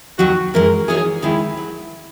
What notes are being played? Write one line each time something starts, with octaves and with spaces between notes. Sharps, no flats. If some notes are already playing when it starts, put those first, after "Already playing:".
D#2 D#3 F#3 F#4
F#2 E3 G#3 A#4
E3 B3 D#4 F#4 G#4 C#5
D#2 D#3 G#3 D#4 E4
F#3